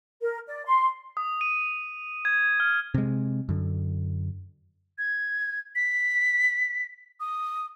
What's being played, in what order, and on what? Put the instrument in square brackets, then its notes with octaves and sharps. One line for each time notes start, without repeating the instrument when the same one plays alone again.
[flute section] A#4
D5
C6
[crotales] D#6
D#7
G#6
F6
[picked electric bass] C3 G#3
F#2 D3
[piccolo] G#6
B6
D#6